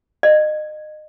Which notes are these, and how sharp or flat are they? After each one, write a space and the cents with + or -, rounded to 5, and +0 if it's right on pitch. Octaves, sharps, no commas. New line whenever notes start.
D#5 -30